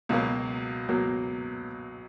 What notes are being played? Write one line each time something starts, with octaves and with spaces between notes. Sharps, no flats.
C#2 B2 F#3 A#3
C#2 B2 F#3 A#3